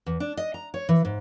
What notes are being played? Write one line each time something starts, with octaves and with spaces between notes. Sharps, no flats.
E2
D4
D#5
A#5
C#5
E3
G#2